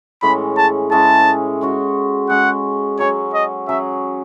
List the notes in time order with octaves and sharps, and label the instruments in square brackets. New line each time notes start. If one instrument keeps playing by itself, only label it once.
[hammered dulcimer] A2 E3 G#3 C#4 [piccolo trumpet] B5
[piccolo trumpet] A5
[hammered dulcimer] A2 E3 G#3 C#4 [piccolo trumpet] A5
[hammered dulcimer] G#3 C#4 F#4
[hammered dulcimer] G#3 C#4 F#4 [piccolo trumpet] F#5
[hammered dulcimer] F#3 C#4 G#4 [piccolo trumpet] C#5
[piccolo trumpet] D#5
[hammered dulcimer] F#3 C#4 G#4 [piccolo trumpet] E5